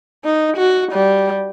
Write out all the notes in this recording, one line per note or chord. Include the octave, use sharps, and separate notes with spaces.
D#4
F#4
G3